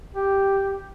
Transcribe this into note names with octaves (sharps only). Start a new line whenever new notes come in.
G4